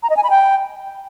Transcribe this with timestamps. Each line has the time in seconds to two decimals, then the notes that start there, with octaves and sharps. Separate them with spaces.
0.03 A#5
0.10 D#5
0.16 G#5
0.23 B5
0.30 G5